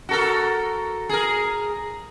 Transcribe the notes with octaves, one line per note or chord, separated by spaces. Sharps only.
F#4 A4 A#4
G#4 A#4